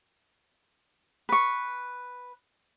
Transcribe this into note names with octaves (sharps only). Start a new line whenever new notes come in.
B4 C#6